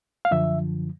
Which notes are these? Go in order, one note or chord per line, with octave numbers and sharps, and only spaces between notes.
F5
F#2 D3 F3 E5